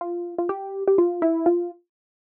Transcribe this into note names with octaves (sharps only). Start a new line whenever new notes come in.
F4
F4
G4
G4
F4
E4
F4